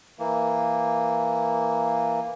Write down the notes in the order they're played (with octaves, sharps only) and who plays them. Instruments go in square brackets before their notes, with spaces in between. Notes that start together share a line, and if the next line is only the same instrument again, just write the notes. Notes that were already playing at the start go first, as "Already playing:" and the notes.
[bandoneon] E3 A#3